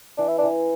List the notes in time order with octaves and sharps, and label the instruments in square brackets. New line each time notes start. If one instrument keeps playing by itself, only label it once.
[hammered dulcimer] E3 [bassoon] D4
[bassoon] E4
D4
[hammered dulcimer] E3